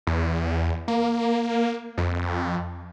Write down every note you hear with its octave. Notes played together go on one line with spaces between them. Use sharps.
E2
A#3
F2